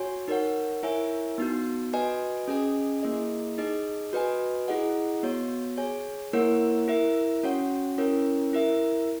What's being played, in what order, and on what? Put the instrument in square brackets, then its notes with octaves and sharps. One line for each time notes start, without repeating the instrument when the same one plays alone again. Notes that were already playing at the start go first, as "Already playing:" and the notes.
Already playing: [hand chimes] F#4 C#5 G#5
D#4 A#4 C#5 F#5
E4 A#4 C#5 E5 G#5
B3 D#4 F#4
F#4 B4 D#5 G#5
C#4 G#4 D#5 G#5
A#3 E4 G#4 D#5
D#4 G#4 D#5
F#4 B4 D#5 G#5
E4 G#4 D#5 F#5
B3 F#4 C#5
G#4 C#5 G#5
A#3 E4 A#4 C#5 F#5
E4 A#4 E5
C#4 F#4 C#5 F#5
C#4 E4 A#4 C#5
E4 A#4 E5